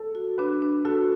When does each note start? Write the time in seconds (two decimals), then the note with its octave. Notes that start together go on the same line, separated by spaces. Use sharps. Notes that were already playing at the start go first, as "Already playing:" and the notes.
Already playing: A4
0.15 F#4
0.38 D4 B4
0.62 D4
0.85 F#4 A4